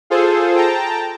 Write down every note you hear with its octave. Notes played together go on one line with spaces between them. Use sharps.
F4 G#4 A4 C5
G5 A5 A#5